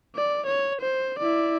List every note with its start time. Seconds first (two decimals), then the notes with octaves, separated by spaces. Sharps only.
0.16 D5
0.46 C#5
0.81 C5
1.19 E4 D5